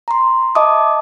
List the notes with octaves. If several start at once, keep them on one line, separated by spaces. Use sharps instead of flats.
A#5 C6
D#5 E5 A5 D6 D#6